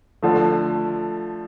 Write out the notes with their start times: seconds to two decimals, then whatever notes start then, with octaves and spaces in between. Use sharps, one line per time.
0.22 D3 F3 A3